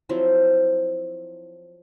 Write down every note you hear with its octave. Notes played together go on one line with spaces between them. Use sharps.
F3 F#3 C4 E4